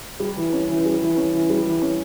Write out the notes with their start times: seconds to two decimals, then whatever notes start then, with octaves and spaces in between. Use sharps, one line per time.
0.20 G3
0.37 E3
0.53 C#4
0.69 E3
0.85 G3
1.02 E3
1.17 C#4
1.33 E3
1.50 G3
1.67 E3
1.82 C#4